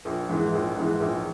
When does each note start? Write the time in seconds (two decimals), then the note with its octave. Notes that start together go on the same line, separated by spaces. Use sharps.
0.05 A#1
0.29 G#2 E3
0.53 A#1
0.77 G#2 E3
1.00 A#1